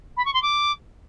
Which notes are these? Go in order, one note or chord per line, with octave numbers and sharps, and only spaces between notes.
B5
C#6
C6
D6